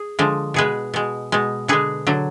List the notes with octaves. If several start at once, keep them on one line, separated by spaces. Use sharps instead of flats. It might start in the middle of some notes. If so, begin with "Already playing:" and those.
Already playing: G#4
D3 F3 G#3
B2 G#3 G#4 B4
B2 G#3
B2 G#3
D3 G#3 G#4 B4
D3 F#3